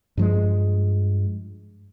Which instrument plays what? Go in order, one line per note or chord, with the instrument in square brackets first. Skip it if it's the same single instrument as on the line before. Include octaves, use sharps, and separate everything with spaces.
[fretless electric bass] G2 F3 G#3